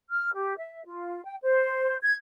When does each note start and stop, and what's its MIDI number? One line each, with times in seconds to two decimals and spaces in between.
0.10 0.33 89
0.34 0.54 67
0.57 0.84 76
0.86 1.23 65
1.25 1.35 79
1.42 1.96 72
2.02 2.14 92